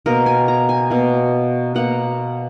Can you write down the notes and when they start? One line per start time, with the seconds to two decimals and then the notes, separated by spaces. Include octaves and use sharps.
0.06 B2 A#3 A#4
0.26 G#5
0.48 A#5
0.69 G#5
0.90 B2 A#3
1.75 B2 A#3 F#5